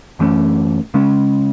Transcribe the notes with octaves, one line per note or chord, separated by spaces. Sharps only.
F#2 E3 A3 C#4
C#3 G#3 C#4